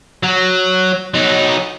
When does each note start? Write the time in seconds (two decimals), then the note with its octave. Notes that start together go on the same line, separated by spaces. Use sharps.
0.23 F#3
1.14 F#3 D#4